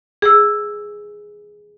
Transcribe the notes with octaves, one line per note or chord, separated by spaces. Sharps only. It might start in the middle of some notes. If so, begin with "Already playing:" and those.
G#4 E6